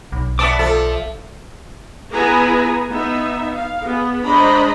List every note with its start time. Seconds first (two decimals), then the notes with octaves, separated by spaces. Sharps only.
0.12 B1
0.39 B3 D5 E5 A5 D6
0.59 F3 A4
2.11 B3 E4 G#4 B4 G#5 A#5
2.90 B3 D#4 E5
3.54 F5
3.85 B3 G#4
4.24 G#3 D4 C5 D#5 A#5 B5